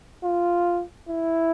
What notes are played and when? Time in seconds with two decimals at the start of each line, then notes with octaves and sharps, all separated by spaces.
0.23 F4
1.08 E4